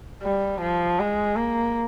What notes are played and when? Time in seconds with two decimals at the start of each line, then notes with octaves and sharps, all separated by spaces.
0.22 G3
0.61 F3
0.99 G#3
1.36 A#3